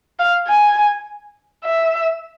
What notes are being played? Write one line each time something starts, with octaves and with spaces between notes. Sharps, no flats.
F5
G#5
E5